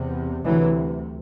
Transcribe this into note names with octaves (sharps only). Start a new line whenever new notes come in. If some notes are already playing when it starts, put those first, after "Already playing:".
Already playing: E2 C3
D2 C3 E3 F#3